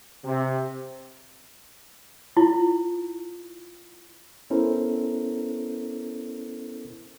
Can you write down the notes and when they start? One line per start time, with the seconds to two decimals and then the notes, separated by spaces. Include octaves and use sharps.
0.24 C3
2.37 E4 F4
4.50 B3 C#4 E4 A4 A#4 C5